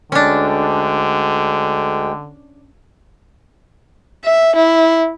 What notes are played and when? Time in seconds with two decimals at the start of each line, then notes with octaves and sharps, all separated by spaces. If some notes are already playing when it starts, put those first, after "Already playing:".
0.12 D2 D3 G#3 C#4 D4 G5
4.25 E5
4.56 E4